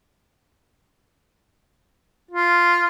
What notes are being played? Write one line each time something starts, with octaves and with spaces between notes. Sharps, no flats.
F4